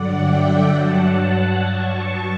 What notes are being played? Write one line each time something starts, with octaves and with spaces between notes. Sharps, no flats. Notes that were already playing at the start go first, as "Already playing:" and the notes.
Already playing: G2 D3 F#3 D5 F#5
E5 G5
G2 F#3 F#5 A5
G2 F#3 A5 C#6